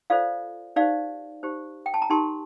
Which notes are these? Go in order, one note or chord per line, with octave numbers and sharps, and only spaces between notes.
F4 A4 C5 D5 F5
D#4 G4 C5 D5 F5
D#4 G4 C5
G5
A5
A#5
D#4 G4 A#4 A5 C6